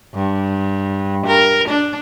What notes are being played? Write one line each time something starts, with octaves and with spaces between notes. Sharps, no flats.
G2
A#4
D4